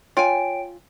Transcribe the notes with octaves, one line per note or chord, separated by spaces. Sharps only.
F4 C#5 G5 G#5 D7